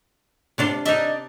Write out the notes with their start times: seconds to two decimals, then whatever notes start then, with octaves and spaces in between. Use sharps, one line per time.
0.58 C3 D4 F4
0.85 D4 D#4 D#5 E5